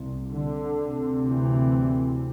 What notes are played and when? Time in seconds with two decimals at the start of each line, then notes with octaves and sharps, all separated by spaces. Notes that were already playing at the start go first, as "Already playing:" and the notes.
Already playing: C2 C3
0.30 D3
0.77 D2 C3
1.24 E3